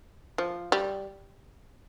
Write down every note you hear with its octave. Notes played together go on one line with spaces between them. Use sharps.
F3
G3